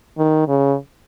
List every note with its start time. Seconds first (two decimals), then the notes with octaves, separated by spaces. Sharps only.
0.18 D#3
0.48 C#3